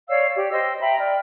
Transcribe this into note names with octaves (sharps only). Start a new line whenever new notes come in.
C#5 D5 F5 E6
G4 D5
C5 D#5 G5 E6
E5 G5 A#5 B5
D5 G5 F6